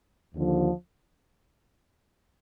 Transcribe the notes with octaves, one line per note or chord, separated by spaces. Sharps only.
D#2 D3 F3